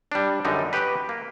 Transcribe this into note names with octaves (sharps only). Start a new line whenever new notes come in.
G3 D4
F#2 D3 G3 D#4
F#4 G4 B4
A#3